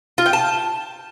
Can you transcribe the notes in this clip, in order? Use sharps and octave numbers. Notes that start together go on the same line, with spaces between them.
F4
G5
A5